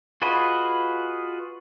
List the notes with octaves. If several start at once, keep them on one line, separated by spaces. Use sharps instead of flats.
F4 F#4 G#4 B4 D#5